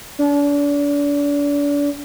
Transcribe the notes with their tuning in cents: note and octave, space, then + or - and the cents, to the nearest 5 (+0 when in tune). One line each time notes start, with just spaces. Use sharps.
D4 -35